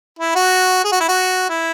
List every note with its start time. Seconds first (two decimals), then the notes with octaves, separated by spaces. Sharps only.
0.19 E4
0.35 F#4
0.84 G#4
0.92 F#4
1.00 E4
1.09 F#4
1.49 E4